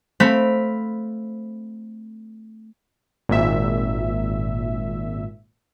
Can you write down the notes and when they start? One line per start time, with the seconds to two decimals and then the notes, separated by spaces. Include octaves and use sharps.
0.20 A3 C4 F5 B5
3.29 G#1 A#2 E5